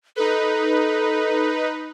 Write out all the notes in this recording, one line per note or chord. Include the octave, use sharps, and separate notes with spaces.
D#4 A4 B4